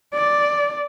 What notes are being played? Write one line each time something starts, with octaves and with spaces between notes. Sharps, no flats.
D5